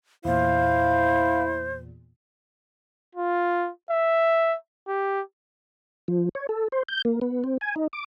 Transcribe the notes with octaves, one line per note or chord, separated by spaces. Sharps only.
E2 A#2 E4 C5 F5
F4
E5
G4
F3
C#5
A4
C5
G6
A#3
B3
C4
G#5
D#4
D6